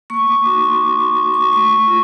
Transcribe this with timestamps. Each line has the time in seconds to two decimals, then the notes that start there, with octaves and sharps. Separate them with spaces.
0.10 A#3 C#6
0.28 D6
0.46 D#4 F#4 C#6
0.64 C6
0.81 A#3 D6
0.99 C#6
1.16 D#4 F#4 D6
1.34 C#6
1.52 A3 C#6
1.87 F4